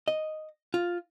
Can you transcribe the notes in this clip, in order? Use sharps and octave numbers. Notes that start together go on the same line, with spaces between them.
D#5
F4